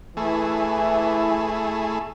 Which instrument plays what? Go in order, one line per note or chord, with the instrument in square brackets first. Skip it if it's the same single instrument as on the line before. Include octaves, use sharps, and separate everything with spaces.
[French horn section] E3 [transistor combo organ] A3 E4 G#4